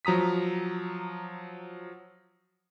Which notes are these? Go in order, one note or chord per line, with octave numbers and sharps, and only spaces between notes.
F3 F#3 A#5 D#6 B6